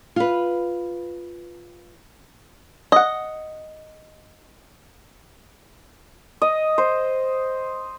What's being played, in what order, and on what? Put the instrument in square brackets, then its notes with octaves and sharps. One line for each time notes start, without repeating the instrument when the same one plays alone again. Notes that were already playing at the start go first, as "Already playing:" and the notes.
[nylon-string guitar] F4 B4
[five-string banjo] D#5 F#5
[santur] D#5
C5